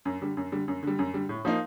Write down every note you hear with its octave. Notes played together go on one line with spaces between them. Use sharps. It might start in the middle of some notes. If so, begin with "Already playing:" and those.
F#2
D3 G3
F#2
D3 G3
F#2
D3 G3
F#2
D3 G3
A2
F3 A#3 D#4